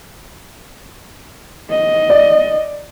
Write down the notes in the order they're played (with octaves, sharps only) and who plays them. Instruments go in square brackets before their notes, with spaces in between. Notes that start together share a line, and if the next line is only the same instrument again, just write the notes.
[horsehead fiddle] D#5
[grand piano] D5